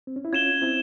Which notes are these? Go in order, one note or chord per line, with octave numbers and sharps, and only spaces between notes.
C4
C#4
E4
C#4 F4 G#6 E7 G7
C4 E4